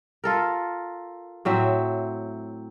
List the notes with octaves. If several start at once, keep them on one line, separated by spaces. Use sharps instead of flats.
F4 A4 A#4
A2 F#3 C4 E5